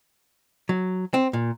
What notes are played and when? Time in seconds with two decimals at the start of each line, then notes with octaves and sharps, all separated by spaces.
0.69 F#3
1.14 C4
1.33 A#2